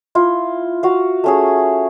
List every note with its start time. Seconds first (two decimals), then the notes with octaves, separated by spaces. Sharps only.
0.15 E4 F4
0.83 F#4 F5
1.24 A3 C#4 G#4